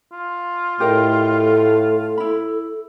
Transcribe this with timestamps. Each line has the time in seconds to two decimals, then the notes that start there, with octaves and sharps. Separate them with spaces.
0.12 F4
0.80 A2 G4 A4 A#4 D#5
2.18 E4 B5